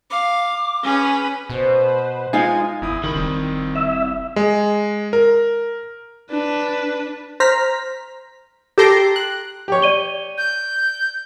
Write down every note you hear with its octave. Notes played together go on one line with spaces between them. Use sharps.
F5 D6
C#4 G#4 B4
B2 B4 C5
G#3 D#4 F4 F5 G#5
G#1 E2 E4 D#6
D3 D#3 G3 B5
F1 G3 C4
E5
G#3
A#4
D4 B4
C5 A#5 F6 B6
G4 A4 A5 A#5 C6 D6
F#6
G4 C#5
D5 D#7 G7
G6